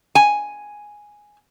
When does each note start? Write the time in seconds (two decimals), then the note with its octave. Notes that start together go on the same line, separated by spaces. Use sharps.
0.15 G#5